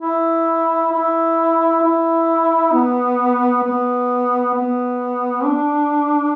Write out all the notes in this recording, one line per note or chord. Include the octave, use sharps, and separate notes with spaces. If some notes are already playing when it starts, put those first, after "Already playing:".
E4
E4
E4
B3
B3
B3
D4